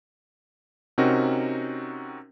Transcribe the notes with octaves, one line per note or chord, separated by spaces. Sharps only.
C3 C4 C#4 D#4 F#4 A#4